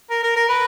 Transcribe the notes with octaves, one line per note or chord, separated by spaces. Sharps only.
A#4
A#4
A#4
B4